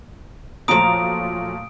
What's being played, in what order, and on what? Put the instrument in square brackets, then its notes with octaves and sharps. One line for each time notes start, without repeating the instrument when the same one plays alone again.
[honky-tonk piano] A#2 F#3 A3 [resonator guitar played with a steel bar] F3 A#5 [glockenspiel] D#6 D7